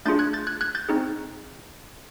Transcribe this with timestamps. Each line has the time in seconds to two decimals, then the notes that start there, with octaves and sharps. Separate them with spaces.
0.05 A3 D4 F4 G#4 G6 A6
0.19 F#6 G#6
0.33 G6 A6
0.47 F#6 G#6
0.61 F#6 G#6
0.75 G6 A6
0.89 C4 D#4 G#4